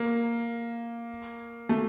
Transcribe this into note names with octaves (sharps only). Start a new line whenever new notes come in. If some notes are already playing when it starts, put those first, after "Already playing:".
Already playing: A#3
A3